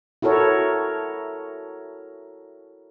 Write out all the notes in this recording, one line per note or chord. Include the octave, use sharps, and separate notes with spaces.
E4 F#4 A4 A#4 C#5